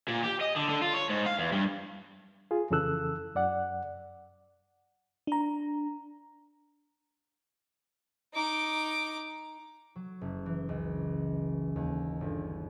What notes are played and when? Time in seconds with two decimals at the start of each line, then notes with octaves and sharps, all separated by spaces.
0.08 A#2
0.24 G4
0.41 D#5
0.56 D3
0.69 D3
0.82 F4
0.94 C#5
1.10 G#2
1.26 F5
1.39 E2
1.53 G2
2.51 F4 G#4
2.71 F2 C#3 E3 A4 E6 F#6
3.35 F#2 D5 F#5
5.27 D4 A#5
8.34 D#4 D6
9.96 F#3
10.21 F#1
10.46 E3
10.69 C#2
11.76 D#2
12.21 G1